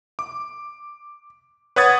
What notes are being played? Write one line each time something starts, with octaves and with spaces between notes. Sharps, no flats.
D6
B4 C#5 F#5 D#6 G#6 A6